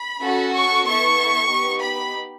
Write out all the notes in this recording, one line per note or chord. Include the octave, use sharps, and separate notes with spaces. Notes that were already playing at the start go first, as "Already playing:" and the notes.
Already playing: B5
C#4 F#4 A4
C#6
B3 E4 A4 C#6
B3 D#4 G4
B5